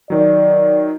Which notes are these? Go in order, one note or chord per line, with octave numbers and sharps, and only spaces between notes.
D#3 F#3 D5